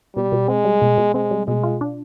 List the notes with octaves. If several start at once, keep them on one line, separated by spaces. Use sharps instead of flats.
B2 G3
B2
G#3 C4
G3
B2
B2
G#3 C4
G3
B2 G#3
F4
D4